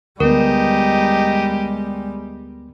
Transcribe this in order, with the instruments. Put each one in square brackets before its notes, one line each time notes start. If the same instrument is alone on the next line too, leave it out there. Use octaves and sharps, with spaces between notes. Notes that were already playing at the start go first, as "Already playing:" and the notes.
[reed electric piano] D2 B3 [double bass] G3 G#3 [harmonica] D#4 G4 [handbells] A#4